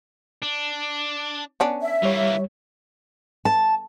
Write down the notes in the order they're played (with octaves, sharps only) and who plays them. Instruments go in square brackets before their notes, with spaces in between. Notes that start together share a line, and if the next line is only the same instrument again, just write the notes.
[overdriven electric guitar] D4
[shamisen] B3 C#4 D4
[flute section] E5
[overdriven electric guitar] E3 A#3 [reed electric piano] G3 C#5
[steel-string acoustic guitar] A5